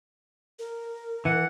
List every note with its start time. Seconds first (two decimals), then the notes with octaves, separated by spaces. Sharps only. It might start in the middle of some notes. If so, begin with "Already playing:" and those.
0.59 A#4
1.25 E3 F#5